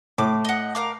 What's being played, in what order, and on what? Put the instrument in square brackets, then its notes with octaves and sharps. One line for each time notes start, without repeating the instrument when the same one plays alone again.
[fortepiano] A2 [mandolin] D6
[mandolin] D#5 F#5
A#4 F5 D6